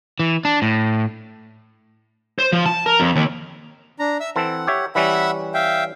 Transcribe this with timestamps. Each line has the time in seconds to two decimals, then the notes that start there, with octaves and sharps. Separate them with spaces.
0.20 E3
0.45 D4
0.62 A2
2.39 C5
2.52 F3
2.66 A5
2.86 A#4
3.00 F2
3.16 D#2
3.99 D4 A#5
4.20 E5 E6
4.36 E3 C4 A4 F#5
4.67 G4 C#5 E5
4.95 E3 G3 C#4 E5 F#5 B5
5.54 E5 F5 G5